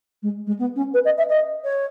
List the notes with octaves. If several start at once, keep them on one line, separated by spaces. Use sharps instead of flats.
G#3
G#3
B3
C#4
B4
D#5
E5
D#5
C#5